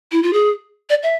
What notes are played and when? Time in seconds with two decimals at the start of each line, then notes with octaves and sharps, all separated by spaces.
0.12 E4
0.23 F4
0.33 G#4
0.90 D5
1.03 E5